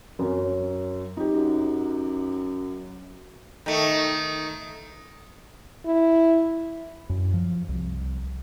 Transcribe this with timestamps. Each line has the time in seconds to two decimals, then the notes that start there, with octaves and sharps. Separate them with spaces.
0.19 F#2 C#4
1.17 D#4 G4
1.34 F#2
3.66 D#3 A3
5.85 E4
7.09 F#2
7.34 F3
7.69 C2